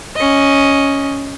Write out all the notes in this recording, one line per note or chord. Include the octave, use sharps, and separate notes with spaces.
C#4 D#5